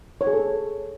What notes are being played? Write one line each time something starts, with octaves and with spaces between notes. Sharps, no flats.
C#5
G#4
A4